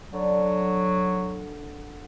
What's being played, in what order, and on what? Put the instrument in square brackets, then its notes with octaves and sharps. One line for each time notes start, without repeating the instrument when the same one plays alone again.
[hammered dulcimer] D3 [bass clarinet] F#3